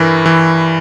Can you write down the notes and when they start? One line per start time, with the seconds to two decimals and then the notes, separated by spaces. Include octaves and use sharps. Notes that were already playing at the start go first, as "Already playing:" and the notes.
Already playing: G2 E3 A#4
0.26 E3